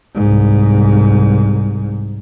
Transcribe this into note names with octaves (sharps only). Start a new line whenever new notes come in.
C2 G#2